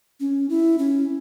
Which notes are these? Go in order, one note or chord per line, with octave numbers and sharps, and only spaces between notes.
C#4
E4
C#4